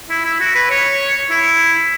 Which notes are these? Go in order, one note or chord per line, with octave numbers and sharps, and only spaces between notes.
E4
E4
F#4
B4
C#5
E4